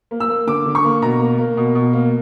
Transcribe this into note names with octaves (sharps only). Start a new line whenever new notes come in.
A#3
E6
A#3
D3 D6
D3
C#6
A#3
B2 A#5
A#3
A#3
B2
B2
A#3